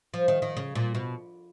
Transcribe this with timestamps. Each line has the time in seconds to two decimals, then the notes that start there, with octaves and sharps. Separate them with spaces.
0.14 F3
0.28 D#3
0.42 D#3
0.57 C#3
0.75 A#2
0.95 B2